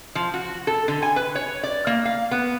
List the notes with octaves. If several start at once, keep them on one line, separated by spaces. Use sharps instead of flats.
F3
F#4
A4
D3
G#5
B4
C#5
D5
A#3
F5
B3